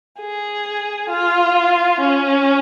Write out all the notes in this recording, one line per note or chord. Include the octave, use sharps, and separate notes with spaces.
G#4
F4
C#4